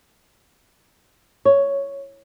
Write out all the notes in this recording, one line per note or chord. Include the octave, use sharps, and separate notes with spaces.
C#5